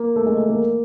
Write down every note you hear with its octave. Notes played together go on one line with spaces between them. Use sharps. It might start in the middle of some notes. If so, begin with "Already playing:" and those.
Already playing: A#3
A3
G#3
A3
A#3